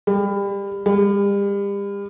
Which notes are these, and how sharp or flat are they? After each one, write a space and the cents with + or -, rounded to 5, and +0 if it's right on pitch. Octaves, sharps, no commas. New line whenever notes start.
G3 +30
G3 +40